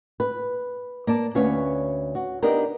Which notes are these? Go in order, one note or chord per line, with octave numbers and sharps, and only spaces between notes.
B4
A#3 D5 A5
D2 C#4 B4 C#5 F5
F#4
B3 D4 D#4 G4 A#4